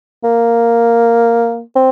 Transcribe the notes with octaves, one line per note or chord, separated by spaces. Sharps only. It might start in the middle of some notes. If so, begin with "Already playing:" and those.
A#3
C4